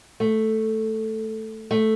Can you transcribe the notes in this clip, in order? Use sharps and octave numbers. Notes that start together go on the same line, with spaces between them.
A3
A3